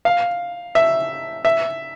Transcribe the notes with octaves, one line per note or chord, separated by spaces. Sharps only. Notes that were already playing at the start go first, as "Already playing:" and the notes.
F5
E5
E5